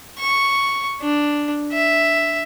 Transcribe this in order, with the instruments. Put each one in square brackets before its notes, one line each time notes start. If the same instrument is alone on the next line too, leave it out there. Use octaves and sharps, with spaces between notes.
[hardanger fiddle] C#6
D4
E5